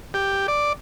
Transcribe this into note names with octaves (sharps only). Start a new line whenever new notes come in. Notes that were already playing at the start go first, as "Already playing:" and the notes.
G4
D5